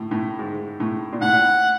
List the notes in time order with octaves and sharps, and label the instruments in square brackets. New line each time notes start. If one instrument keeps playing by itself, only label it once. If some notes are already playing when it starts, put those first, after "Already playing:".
Already playing: [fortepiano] A2
A2
G#2
A2
A#2
[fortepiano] A2 [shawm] F#5